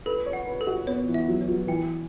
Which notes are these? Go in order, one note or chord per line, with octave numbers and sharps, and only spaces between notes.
A4 B4
C#5
F#5
B4
A4
F#4
B3 C#5
E3
E5
F#3
C#5
F#3
E3 G5